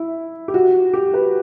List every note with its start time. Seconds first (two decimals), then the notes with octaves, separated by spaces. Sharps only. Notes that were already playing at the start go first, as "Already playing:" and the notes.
Already playing: E4
0.48 G4
0.54 F#4
0.94 G4
1.14 B4